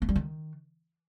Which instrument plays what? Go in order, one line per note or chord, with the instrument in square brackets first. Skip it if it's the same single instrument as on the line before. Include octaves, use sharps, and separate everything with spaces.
[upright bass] A#3
G3
D#3